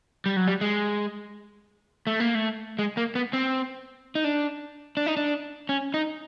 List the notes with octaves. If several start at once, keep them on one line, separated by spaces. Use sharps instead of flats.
G3
F#3
G3
G#3
A3
A#3
A3
G#3
A#3
B3
C4
D#4
D4
D4
D#4
D4
C#4
D#4